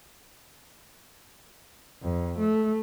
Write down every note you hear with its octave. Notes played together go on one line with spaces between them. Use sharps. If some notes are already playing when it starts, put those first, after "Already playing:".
F2
A3